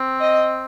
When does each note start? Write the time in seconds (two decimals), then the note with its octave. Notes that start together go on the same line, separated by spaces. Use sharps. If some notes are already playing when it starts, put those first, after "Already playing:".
Already playing: C4
0.21 D#5